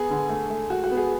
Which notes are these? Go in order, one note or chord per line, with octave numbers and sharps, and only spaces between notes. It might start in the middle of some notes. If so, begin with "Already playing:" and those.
Already playing: B3 G#4
D3
A3
A3
G#3 F#4
F#4
B3
G#4